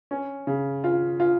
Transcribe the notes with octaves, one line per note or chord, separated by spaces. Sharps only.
C#4
C#3
F4
F4